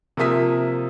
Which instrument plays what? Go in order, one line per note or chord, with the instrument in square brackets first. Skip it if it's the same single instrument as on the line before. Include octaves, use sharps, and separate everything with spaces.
[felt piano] C3 F3 A#3 E5 D#6 B6